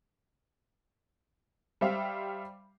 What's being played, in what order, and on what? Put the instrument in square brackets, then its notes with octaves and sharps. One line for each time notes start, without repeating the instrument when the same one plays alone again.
[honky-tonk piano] G3 C5 E5 F5